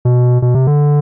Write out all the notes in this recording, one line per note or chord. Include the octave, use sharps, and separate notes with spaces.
B2
B2
C3
D3